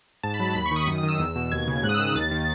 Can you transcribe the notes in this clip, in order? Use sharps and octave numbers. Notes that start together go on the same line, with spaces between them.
G#2 A5
B5
F#3
A5
D#2 B5
C#6
D#3 D#6
F#2 D#6
D#6
D#3
E6
E2 E6
B2
D#2 G#6
C#3
G#2 F#6
D#6
E6
D#3
E6
D#2 A6
D#3